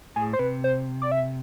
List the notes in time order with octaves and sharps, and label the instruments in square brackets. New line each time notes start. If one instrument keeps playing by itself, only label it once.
[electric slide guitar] A2 [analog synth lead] G#4
[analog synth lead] C5
[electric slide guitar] C3 [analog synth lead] B4
[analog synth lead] C5
D5
E5